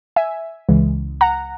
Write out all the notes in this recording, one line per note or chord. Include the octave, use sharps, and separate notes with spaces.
E5 G#5
C#2 C#3 E3 G#3
F#5 A#5